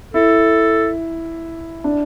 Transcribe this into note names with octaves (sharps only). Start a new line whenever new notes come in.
E4 A4
D4